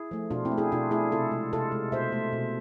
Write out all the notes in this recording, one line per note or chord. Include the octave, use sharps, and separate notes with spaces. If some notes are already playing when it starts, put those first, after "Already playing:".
Already playing: E4 G#4
F3 A3
B2 D4 F4
C4 E4
A3
E4 G#4
B2 D4 F4
A3 E4 G#4
C3 F4 A4
G#3
C3 F4 A4
G#3
B2 C5 E5
A3
B2